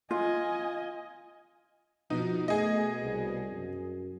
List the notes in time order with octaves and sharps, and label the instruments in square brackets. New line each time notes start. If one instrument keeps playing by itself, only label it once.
[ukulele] F4 [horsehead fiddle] D#5 G#5
[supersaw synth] B2 [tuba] F3 [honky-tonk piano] D#4
[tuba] A3 [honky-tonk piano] G#4 D#5
[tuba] C2
F#2